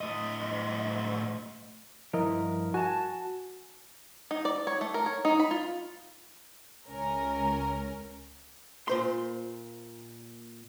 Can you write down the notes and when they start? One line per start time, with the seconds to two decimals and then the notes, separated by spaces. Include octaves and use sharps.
0.01 A2 D#5
2.13 G2 F3 E4 A#4 D#5
2.74 F#4 G#5 A5
4.31 D#4
4.45 D5
4.67 C#5
4.81 A3
4.94 A#4
5.06 C#5
5.25 D#4
5.40 B5
5.51 F4
6.89 C#2 C#4 A#4
8.88 A#2 C5 C6